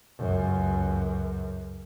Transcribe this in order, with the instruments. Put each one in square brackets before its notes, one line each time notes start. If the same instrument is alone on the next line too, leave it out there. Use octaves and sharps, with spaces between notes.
[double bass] C#2 F#2